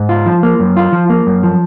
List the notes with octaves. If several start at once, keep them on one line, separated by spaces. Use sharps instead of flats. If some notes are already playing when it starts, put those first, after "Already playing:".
Already playing: G#2
F4
F3
A#3
F#2
F4
F3
A#3
F#2
F3